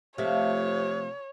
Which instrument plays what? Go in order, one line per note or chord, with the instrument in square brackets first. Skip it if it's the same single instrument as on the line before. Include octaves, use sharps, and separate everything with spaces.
[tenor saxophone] C3 [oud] F3 A3 [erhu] C#5